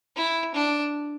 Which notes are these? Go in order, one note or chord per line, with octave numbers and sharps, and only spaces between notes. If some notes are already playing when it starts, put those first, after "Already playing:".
E4
D4